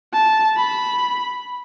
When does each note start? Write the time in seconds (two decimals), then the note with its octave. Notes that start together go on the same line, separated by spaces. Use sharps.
0.13 A5
0.57 B5